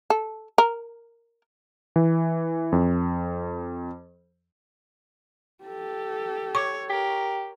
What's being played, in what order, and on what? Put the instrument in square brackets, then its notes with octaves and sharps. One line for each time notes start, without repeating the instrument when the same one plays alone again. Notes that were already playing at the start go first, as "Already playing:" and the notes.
[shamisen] A4
A#4
[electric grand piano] E3
F2
[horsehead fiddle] G4 A4
[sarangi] C#5 [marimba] C#6 D6
[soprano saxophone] G4 [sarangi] A#4